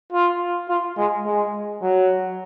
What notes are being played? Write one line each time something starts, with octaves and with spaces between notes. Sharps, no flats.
F4
F4
G#3
G#3
F#3